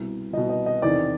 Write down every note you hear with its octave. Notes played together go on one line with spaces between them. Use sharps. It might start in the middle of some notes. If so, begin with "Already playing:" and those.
Already playing: C2 B2
C2 B2 D#5
D#5
D#5
E2 C3 D#3 D5